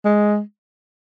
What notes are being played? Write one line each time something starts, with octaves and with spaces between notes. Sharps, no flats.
G#3